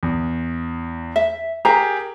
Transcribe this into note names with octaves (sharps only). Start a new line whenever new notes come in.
E2
E5
G4 G#4 A#4 A#5